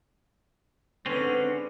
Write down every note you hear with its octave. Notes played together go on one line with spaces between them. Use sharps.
G#2 D3 G#3 C4 C#4 B4